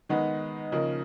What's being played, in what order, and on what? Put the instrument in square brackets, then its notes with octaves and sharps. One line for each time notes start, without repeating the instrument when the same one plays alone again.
[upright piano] D#3 G#3 B3 D#4
C#3 F3 A#3 D#4